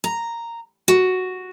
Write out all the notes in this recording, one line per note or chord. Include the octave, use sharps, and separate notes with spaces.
A#5
F#4